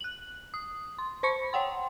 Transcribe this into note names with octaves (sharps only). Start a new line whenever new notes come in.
F#6 F#7
D#6
C6
C5 B5 C#6 C#7
C#5 F#5 G5 C6